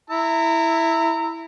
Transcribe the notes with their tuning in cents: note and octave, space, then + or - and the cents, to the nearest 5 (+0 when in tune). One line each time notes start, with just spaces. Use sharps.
E4 +0 A#5 -25 E6 +0